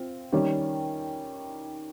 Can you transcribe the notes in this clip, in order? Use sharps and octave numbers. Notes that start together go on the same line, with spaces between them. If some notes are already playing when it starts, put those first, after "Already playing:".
Already playing: C4 F4
D#3 G3 C#4 G4